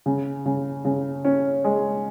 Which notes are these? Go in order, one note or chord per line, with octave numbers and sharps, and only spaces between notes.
C#3
C#3
C#3
C#4
G#3